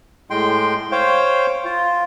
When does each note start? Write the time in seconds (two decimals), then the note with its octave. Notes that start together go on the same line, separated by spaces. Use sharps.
0.30 A2 G#3 G5 C6
0.92 C5 C#5 F5 G5
1.65 F4